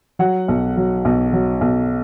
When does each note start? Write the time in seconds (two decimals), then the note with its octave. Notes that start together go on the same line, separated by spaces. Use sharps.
0.19 F#3 F#5
0.48 B1
0.77 F#3
1.05 B1
1.33 F#3
1.61 B1